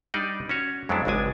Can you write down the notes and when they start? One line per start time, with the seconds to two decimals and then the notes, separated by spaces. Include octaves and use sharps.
0.14 G3 D4 D#4 D5 D#5
0.49 C#4 F#4 C#5
0.89 F2 F#3 G#3 B3 D4 E4
1.05 G#1 C#2 G#3 D4 G#5